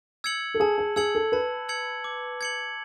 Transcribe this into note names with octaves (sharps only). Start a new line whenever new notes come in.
E6 G#6 C#7 F#7
A4
G#4 A5
G#4
G#4 E6 G#6 C#7 F#7
A4
B4 A5
E6 G#6 C#7 F#7
D6
G#6 C#7 F#7